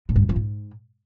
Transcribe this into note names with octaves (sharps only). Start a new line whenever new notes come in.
A2
G2
F#2
F3
G#2